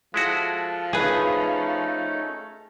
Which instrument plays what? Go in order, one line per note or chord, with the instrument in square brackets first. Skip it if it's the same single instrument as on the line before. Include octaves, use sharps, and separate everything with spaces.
[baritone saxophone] F3 [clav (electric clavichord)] G#3 E4 F#4 [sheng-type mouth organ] A4
[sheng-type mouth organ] A3 C#4 D#4 [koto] G#4 B4